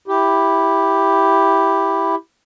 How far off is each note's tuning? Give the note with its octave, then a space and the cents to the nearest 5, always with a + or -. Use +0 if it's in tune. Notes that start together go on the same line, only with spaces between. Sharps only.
E4 +0 G4 +5